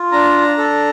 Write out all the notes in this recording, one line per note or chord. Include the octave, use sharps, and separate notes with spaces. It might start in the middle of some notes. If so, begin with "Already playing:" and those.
Already playing: F4
D4 A#5
A4